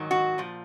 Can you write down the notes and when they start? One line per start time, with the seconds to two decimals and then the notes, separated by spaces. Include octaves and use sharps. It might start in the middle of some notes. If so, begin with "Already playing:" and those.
Already playing: G#2 D#3 F#3
0.11 F#4
0.38 A#2 F3